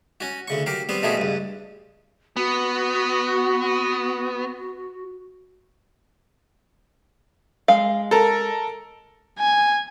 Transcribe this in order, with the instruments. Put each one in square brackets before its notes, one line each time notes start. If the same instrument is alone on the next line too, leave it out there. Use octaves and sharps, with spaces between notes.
[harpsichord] C#4 F#4
D2 C#3 C#6
F#3 G4 A#4 F5
G3 B3 C4 C5
B2 F3 G3 A3 F#4 G#4
C#2 G2
[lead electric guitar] B3 [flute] F#4
[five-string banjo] G#3 F5
[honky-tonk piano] A4 A#4
[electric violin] G#5